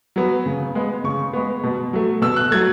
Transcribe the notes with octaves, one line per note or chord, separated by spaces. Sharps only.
F#3 B3
C#3
G#3 B3
C#3 C#6
G#3 B3
B2
F#3 A3
B2 E6
F#6
F#3 A3 G#6